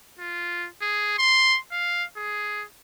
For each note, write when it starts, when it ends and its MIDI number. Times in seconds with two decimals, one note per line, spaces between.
0.19 0.68 65
0.82 1.18 68
1.19 1.58 84
1.72 2.04 77
2.17 2.64 68